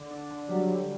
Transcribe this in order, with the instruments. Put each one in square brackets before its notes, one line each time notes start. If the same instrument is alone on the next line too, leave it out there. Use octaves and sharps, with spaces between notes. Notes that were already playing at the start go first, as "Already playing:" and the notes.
Already playing: [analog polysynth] D3
D4
D3
[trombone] F#3 [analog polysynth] G3
[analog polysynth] D3